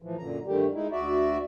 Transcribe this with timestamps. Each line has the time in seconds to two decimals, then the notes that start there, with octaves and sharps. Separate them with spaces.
0.02 A2 E3 F3
0.18 F#2 A#2 D3 A#5
0.47 G2 D3 D#3 G3 A3 G4
0.74 G#3 D#4 E4
0.91 D2 F#4 D5 E5